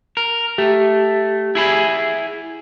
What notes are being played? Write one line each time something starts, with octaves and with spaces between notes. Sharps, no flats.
A#4
A3 G4
E4 G#4 B5